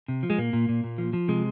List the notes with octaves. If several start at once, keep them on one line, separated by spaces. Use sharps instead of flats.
C3
F3
G#3
A#2 A#3
A#2
A#2
A#2
F3
F3
C3 G#3